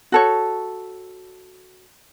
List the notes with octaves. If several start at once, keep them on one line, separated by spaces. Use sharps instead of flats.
F#4 A4 C#5